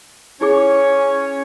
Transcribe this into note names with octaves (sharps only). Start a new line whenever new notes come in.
C#4 E4 G#4 C#5 D6